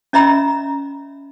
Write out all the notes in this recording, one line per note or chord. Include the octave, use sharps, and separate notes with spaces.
C#4 D#5 E5 A#5 B5 E6